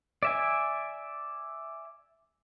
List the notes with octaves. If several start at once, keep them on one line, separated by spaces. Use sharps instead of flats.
D5 E5 G#5